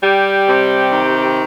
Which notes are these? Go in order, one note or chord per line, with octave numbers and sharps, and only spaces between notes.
G3 G4
C3
D#3